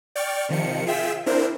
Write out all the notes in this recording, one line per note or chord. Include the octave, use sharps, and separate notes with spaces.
D5 G5 C#6 F6 A6
C3 D#3 F3 C#7
F4 G#4 E5 G5 E6 B6
C4 D4 E4 A#4 C5